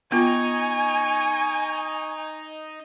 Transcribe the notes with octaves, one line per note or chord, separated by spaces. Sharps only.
B3 D#4 F4 D#5 G#5 C#6